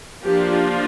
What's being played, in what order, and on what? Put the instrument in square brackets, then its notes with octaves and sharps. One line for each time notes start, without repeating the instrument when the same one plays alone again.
[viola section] F3 A#3 D4 F4 G4